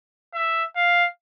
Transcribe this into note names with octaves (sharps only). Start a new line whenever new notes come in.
E5
F5